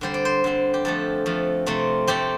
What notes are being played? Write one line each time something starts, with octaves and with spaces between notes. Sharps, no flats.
D3 G3 C4 C5
D5
C5
D3 G3 C4
G4
F2 F3 A3 A4
F2 F3 A3
C3 A3 C4
C3 A3 C4 G4